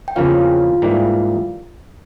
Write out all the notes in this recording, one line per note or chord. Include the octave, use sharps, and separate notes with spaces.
G5
E2 C#3 F3 A#3 C#4 F4 F5
G#2 E3 G3 A#3